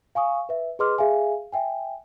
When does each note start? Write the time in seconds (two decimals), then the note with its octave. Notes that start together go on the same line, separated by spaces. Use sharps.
0.15 F5 G#5 C#6 D#6
0.49 B4 E5
0.79 G#4 B4 D#5 C6 D6 F6
0.98 G#4 E5 F5 G#5
1.52 E5 G5 G#5